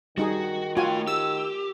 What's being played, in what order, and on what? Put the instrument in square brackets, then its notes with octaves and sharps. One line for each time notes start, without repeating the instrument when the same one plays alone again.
[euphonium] D#3 [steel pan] G3 D#4 G#4 [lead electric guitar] F#4
[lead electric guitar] A3 G5 [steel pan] F4 F#4 G#5
[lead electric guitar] G4 [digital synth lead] E6